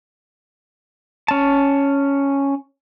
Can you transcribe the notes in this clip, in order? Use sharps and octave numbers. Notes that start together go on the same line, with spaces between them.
C#4 A5